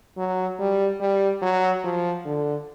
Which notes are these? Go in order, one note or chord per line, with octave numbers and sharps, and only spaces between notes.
F#3
G3
G3
F#3
F3
D3